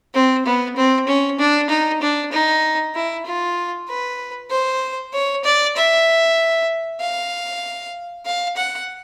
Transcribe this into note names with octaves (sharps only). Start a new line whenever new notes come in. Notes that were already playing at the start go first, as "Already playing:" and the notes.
C4
B3
C4
C#4
D4
D#4
D4
D#4
E4
F4
B4
C5
C#5
D5
E5
F5
F5
F#5